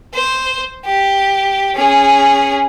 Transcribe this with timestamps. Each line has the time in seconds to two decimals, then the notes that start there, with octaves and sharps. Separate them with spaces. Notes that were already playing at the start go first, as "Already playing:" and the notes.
0.15 C5
0.86 G4
1.76 C#4 G#4